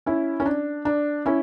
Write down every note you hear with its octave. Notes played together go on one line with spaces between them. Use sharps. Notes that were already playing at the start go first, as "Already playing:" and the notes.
C#4 E4
C#4
D4
D4
C#4 E4